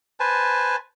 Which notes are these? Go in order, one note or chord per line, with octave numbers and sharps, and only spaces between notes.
B4 C5 G#5 A5